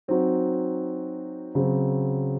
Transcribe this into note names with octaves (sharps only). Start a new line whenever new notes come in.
F#3 C4 D#4 F#4
C#3 F#3 C4